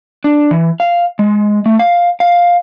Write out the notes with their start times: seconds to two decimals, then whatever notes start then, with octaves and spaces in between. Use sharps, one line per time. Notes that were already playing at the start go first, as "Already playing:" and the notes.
0.24 D4
0.51 E3
0.80 F5
1.19 G#3
1.66 A3
1.79 F5
2.20 F5